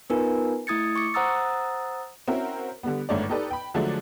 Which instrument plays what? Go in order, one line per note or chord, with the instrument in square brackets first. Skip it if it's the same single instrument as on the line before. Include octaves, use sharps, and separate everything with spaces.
[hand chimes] B3 D#4 F4 A#4 B4 G#5
A3 E4 D#6 G#6 A6 C#7
C#6 D6 C#7
C5 F#5 A#5 D#6 E6 A6
[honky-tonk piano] C4 C#4 E4 F#4 A#4
D3 G3 B3
G1 G#2 A3 D4 C#5 D5
D#4 G4 A4 B4 D5
G5 B5
D3 F3 F#3 G#3 A3 D4